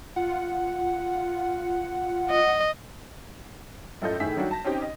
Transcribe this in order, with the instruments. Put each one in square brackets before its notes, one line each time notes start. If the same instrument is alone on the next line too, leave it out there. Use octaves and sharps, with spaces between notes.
[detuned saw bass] F4 [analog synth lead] F#5
[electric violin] D#5
[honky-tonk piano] F#2 A2 F4 A4 D#5 G6
A2 D#3 A3 G#4 E5 B6
D#3 F#3 G3 D4 F#4
A5 A#6
C4 C#4 D#4 G4
D#5